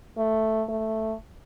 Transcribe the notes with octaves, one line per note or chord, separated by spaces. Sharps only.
A3
A3